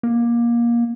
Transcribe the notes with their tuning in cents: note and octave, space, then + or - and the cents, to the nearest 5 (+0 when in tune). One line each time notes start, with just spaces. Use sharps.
A#3 +20